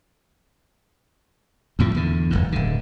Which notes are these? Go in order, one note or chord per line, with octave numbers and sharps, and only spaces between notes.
D2 A2 F3
E2 D3
D1 G1 G#2
D1 D3